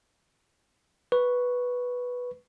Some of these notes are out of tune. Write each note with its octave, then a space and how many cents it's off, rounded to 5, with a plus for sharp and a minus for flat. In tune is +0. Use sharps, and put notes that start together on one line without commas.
B4 -5 C#6 +0